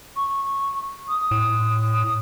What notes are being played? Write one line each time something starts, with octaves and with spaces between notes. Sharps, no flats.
C#6
D#6
A2